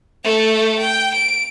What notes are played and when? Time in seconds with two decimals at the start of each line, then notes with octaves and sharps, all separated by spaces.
0.24 A3 A4
0.78 G5
1.14 D7